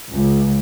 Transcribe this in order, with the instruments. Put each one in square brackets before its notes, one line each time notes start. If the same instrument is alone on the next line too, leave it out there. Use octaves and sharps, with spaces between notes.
[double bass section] C#2